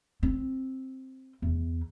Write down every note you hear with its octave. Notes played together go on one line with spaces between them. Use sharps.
C4
E2